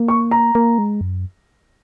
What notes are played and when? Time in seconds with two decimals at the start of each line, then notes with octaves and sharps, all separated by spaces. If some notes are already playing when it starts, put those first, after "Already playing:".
Already playing: A#3
0.08 C#6
0.31 A#5
0.55 A#3
0.78 G#3
1.01 F#2